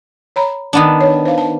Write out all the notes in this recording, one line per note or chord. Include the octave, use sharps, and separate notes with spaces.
C#5 A#5 B5
D#3 B3 D4
C#5
C5 F5
A5